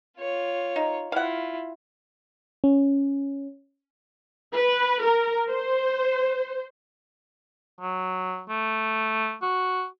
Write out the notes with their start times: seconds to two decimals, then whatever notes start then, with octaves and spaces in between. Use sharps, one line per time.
0.19 F4 C#5
0.76 D#4
1.12 E4 F4 F5 F#5
2.64 C#4
4.55 B4
5.03 A#4
5.49 C5
7.81 F#3
8.50 A3
9.42 F#4